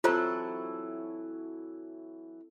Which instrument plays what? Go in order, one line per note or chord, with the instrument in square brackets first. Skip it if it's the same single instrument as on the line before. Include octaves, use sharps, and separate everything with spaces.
[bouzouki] E3 F#3 E4 [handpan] C4 A4 [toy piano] F4 C5 A#5